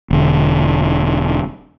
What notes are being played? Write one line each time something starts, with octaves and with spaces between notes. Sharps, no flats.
E1 D3